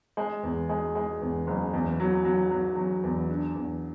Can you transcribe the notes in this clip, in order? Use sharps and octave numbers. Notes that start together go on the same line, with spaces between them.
G#3
E2
G#3
G#3
E2
F#1
E2
F#3
F#3
F#3
F#3
E2
D4
E2